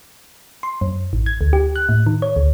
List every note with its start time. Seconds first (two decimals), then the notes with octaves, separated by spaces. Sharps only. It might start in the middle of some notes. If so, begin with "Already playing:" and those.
0.63 C6
0.81 F#2
1.13 A1
1.26 G#6
1.41 D2
1.53 G4
1.76 F#6
1.89 A2
2.07 D#3
2.22 C#5
2.36 D2